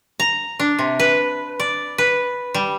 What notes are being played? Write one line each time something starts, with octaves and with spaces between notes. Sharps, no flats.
A#5
D4
C3
B4
D5
B4
G3